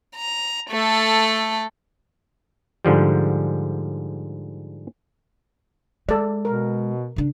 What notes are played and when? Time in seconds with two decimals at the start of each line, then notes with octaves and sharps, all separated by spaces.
0.16 A#5
0.70 A3 A4
2.85 G#2 D3 F3 G3
6.09 G#3 A4 D5
6.45 B2 A#4
7.16 C#3 D4